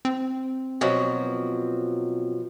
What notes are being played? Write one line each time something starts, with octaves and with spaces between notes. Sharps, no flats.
C4
B2 F3 F#3